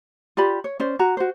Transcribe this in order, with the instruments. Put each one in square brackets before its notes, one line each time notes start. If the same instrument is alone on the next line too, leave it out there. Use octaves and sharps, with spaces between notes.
[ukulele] F4 G4 D5 B5
C#5
C#4 C5 D5
F#4 A#5
F#4 C5